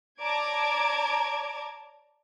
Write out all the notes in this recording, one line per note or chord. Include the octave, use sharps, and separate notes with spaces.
C#5 D5 A5 A#5 D6 G#6